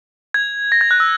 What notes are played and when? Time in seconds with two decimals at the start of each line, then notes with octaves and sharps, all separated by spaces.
0.34 G#6
0.72 A#6
0.81 G#6
0.91 F#6
1.00 E6